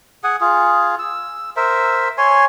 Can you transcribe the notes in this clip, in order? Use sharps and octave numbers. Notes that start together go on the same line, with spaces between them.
G#4 F#5 G#5
F4 G#4
E6
A#4 C5 E5
C#5 G#5 C6